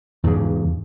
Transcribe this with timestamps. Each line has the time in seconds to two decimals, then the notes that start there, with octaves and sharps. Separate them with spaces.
0.24 E2 G#2 C#3